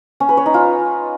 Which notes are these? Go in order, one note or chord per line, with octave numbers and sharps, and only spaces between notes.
C#4
B4
C#5
D#4
F4